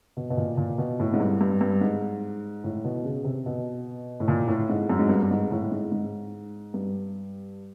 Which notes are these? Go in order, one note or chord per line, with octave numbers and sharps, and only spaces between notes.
B2
B2
A#2
A#2
B2
A2
G#2
G2
G2
G2
G#2
A2
B2
C#3
C3
B2
A2
A#2
A2
G#2
F#2
G#2
G2
G2
G#2
A2
G#2
G#2
G2